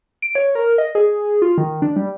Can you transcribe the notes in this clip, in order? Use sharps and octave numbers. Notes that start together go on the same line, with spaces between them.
D7
C#5
A#4
D#5
G#4
F4
D#3
D4
G3